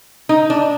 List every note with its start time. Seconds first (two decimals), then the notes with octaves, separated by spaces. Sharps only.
0.29 D#4
0.50 D4